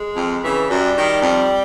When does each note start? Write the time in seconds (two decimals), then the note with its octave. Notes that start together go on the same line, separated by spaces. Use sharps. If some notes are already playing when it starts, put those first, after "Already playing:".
Already playing: G#3
0.16 F2
0.43 C#3 E3
0.70 F#2 G3
0.97 D#3
1.23 F2